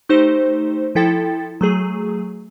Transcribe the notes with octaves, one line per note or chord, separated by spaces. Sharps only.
A3 D#4 G4 C5
F3 E4 A4 G5 A6
F#3 A3 G#4